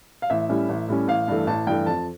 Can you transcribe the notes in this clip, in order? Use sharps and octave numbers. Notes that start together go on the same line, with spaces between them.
F5
A1 E5
A2 G3 C#4
A1
A2 G3 C#4
A1 F5
G2 E3 A3
A1 A5
G2 E3 A3 G5
F2 A5